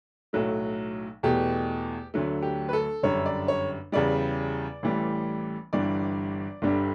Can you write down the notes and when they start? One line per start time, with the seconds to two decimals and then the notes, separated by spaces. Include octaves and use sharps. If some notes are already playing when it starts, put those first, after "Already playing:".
0.33 B1 A2 F#3 A3
1.23 E2 B2 A3 G4
2.14 D2 D3 F#3 A3
2.42 G4
2.69 B4
2.73 A4
3.03 G1 F#2 D3 G3 C#5
3.26 D5
3.48 C#5
3.92 E2 C#3 G3 D5
4.83 A1 A2 E3 G3
5.73 G1 G2 E3 G3 D5
6.62 G1 G2 D3 G3